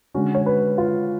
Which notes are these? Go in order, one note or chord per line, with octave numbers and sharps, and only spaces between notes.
D3 G#3 C#4 F#4
C#5
B4
F4